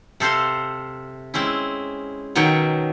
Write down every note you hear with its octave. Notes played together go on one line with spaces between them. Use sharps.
C3 A4 C5 F5 C6
G#3 C4 C#4 E4
B2 D#3 F#3 C#5 G5